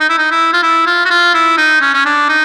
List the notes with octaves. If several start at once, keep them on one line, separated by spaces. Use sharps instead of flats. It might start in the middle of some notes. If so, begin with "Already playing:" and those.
D#4
E4
D#4
E4
F4
E4
F4
F#4
F4
E4
D#4
C#4
C#4
D4
D#4